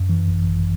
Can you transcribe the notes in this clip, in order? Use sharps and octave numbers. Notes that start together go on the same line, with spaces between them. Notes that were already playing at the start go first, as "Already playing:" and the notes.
Already playing: F#2
E3
G#1
G#1